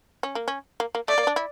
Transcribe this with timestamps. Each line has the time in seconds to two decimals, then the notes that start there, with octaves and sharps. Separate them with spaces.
0.23 C#4
0.35 A#3
0.48 C#4
0.80 A#3
0.95 A#3
1.08 A3 D5
1.18 A#3
1.27 D4
1.36 E4